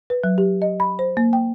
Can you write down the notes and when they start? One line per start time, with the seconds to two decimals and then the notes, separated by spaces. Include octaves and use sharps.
0.10 B4
0.24 F#3
0.38 G4
0.62 D#5
0.80 B5
0.99 C5
1.17 A#3
1.33 G5